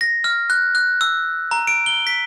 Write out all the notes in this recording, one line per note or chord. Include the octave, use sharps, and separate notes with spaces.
A#6
F6
F#6
F#6
E6
A#5
D7
G7
B6